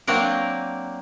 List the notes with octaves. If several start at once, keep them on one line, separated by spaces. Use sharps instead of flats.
F#3 A#3 C4 D4 A#4